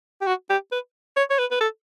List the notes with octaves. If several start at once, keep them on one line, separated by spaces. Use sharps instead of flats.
G4
F#4
G4
B4
C#5
C#5
B4
B4
A4